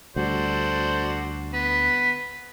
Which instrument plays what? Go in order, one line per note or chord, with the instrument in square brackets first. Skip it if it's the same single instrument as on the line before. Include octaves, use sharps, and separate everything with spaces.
[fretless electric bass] D2 G3 [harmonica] F#4 A4 D5 [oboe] C5
[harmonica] B3 [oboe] B5